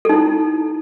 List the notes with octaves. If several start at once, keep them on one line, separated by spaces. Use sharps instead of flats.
D#4 E4 A4